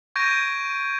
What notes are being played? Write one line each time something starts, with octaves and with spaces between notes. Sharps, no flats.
C#6 G6 G#6 A#6 D7 D#7